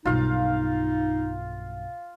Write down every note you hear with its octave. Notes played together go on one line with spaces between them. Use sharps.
B1 G2 D#4 F4 F5